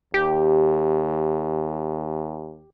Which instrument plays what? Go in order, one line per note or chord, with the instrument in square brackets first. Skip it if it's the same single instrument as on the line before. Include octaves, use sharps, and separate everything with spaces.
[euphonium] D#2 [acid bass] G4